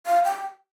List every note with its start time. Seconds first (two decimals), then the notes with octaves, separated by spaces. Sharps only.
0.06 F5
0.25 G5